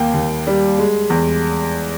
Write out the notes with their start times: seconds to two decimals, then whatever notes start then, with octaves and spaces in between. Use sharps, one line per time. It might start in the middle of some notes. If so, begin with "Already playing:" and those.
Already playing: D#2 A#3 G5
0.14 D#2
0.47 G3
0.78 G#3
1.10 E2